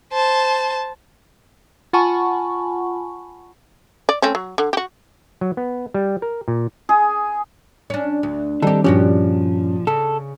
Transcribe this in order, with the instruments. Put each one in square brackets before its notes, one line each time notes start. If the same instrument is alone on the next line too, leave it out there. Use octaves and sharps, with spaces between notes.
[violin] C5 A5
[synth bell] F4 F#5 G#5 A5 B5 C#6
[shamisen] D5
A3 C4 C#4
F#3
D3
F#4 G4
[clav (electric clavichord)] F#3
B3
G3
A#4
A#2
[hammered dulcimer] G#4
[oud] C#4 D4
D2
[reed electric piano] D#3 G3 C4 [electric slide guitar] D4 A4 [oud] D#4 G4
[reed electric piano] G2 C#4 [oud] A#2 F#4 G4 [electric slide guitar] F3
[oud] C#3 [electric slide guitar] A4